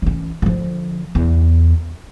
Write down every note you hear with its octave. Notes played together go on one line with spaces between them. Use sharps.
E3 C#4
D3 F3
E2